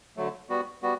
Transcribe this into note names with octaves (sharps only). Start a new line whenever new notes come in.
D3 F#3 A3
G3 B3 F#4
G3 B3 F#4